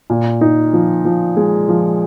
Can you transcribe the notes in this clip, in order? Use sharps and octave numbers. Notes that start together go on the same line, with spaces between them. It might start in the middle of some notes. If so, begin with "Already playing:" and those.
A#2
D#4
F3
F3
G#3
F3